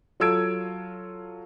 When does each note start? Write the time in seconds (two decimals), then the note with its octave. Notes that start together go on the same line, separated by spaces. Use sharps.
0.20 F#3 F4 A4 E6 G#6 D7